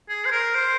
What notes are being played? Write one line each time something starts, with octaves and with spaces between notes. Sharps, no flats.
G#4
C5
A#4
C5